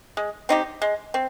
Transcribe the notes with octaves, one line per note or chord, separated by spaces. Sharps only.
G#3
C4 D#4 G4
G#3
C4